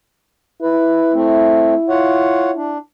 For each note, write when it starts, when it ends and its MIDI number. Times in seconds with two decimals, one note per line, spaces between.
0.62 2.78 64
0.62 1.13 71
1.14 1.75 57
1.14 1.75 60
1.89 2.51 65
1.89 2.51 73
1.89 2.51 78
2.56 2.78 62